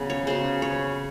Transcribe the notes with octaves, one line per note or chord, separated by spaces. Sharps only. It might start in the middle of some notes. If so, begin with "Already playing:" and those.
Already playing: C#3 F#3 B3
C#5
C#3 F#3 B3 C5
C#5